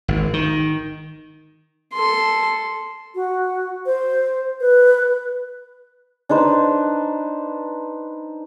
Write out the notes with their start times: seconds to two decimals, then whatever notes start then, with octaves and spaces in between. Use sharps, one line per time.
0.08 G#1
0.34 D#3
1.93 A4 C6
3.15 F#4
3.86 C5
4.61 B4
6.29 D4 D#4 B4 C5